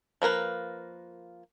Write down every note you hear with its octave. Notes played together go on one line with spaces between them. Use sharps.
F3 A#3 A#4 B4